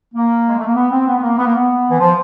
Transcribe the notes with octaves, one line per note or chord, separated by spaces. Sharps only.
A#3
G#3
A3
A#3
B3
C4
B3
B3
A#3
B3
A#3
B3
E3
F3